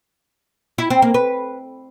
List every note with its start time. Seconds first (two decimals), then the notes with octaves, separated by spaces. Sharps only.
0.78 E4
0.90 C4
1.02 A#3
1.14 B4